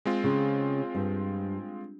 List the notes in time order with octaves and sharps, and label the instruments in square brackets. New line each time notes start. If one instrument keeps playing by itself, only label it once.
[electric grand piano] G#3 C4 F4
[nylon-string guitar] C#3
G2